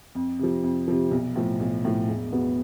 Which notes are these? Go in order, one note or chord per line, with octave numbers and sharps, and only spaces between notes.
F2
C3 F3
F2
C3 F3
B1
A2 F3
B1
A2 F3
E1
E2 B2 B3